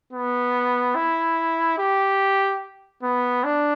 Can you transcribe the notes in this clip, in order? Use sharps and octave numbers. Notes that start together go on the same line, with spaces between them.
B3
E4
G4
B3
D4